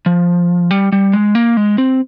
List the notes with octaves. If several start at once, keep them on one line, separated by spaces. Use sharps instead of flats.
F3
G3
G3
G#3
A#3
G#3
C4